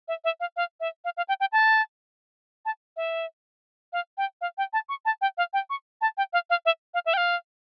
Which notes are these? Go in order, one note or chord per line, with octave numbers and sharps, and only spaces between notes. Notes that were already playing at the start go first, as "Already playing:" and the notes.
E5
E5
F5
F5
E5
F5
F5
G5
G5
A5
A5
E5
F5
G5
F5
G5
A5
C#6
A5
G5
F5
G5
C#6
A5
G5
F5
F5
E5
F5
E5
G5
F5